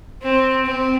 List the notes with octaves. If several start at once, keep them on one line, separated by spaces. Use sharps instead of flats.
C4
C4